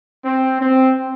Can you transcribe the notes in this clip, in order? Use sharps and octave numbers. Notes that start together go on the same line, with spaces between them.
C4
C4